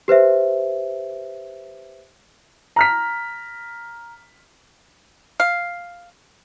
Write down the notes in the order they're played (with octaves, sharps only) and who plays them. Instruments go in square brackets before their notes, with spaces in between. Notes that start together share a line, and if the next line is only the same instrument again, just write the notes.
[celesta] G4 B4 C5 E5
[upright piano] A#5 F6 B6
[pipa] F5